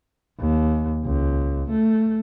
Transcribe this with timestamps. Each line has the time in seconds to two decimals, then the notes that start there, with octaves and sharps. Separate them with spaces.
0.40 D#2
1.05 C#2
1.70 A3